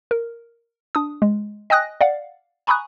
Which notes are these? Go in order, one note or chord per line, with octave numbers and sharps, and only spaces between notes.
A#4
D4 D#6
G#3
D#5 G5 G#5 D#6 F#6 A#6
D5 F5 F#5
G#5 A#5 B5 C#6 D#6 F#6